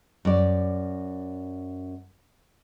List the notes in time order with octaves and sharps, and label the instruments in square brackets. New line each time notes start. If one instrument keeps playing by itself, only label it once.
[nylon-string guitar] F#2 D5